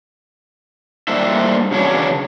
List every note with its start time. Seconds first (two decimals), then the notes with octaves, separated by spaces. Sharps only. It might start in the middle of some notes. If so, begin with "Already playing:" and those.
1.08 G3 A3 A#3 D4 C5 E5
1.71 E2 C#3 F#3 D4 C#5